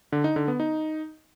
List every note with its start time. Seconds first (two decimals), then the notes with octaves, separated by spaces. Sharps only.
0.12 D3
0.24 D#4
0.36 D3
0.48 B3
0.60 D#4